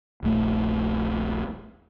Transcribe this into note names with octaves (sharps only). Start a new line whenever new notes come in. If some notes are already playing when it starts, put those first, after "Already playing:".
D#1 A#1 A3